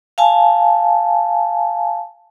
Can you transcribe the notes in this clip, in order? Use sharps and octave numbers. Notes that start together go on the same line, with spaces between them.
F5 G#5 A5